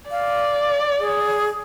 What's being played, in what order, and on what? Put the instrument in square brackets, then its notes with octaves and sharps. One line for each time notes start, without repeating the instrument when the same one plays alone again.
[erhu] D5 [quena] F5
[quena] G#4